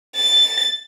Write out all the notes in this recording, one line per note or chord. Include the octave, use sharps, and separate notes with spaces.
A6